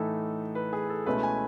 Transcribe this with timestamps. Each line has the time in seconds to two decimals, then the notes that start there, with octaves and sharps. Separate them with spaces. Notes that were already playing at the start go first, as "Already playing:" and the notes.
Already playing: A2 E3 A3 D#4 A4
0.55 B4
0.73 G#4
0.90 A4
1.06 C#2 B2 A3 C#4 E4 B4
1.23 G#5